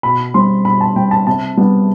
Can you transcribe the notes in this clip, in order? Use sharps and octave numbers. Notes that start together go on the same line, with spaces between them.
B2 B5
G3 C4 C6
B2 B5
A5
G3 C4 G5
A5
C3 A5
G3 B3 D4